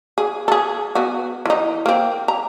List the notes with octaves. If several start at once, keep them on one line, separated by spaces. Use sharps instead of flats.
G#4
G#4 A4
B3 F#4
E3 D#4
A#3 C4
A#5